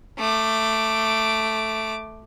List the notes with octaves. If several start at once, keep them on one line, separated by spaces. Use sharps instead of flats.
A3 D6